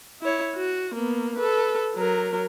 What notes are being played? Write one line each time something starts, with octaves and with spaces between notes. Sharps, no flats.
E4 C#5
F#4
A#3 B3
A4 B4
F#3 A#4